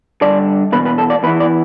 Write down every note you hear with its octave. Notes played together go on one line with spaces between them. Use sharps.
G2 D3 D5
E2 B2 B4
B4
A4
D5
E2 E3 B4
D5